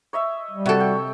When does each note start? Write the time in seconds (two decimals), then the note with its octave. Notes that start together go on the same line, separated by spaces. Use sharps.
0.13 C#5 D#5 E5
0.51 G3
0.66 C3 F#4 A4 C#5
0.80 G5